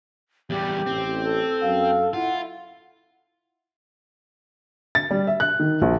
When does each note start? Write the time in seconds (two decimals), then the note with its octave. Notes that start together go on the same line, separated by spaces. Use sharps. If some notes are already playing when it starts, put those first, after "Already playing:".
0.50 E2 G3 G4
0.86 A1 C4
1.24 A4
1.62 F#2 F5
2.13 E4 F4 F#5
4.95 A6
5.11 G3
5.27 E5
5.40 F#6
5.60 D#3
5.82 A#1